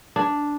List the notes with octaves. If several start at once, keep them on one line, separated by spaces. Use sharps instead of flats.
D4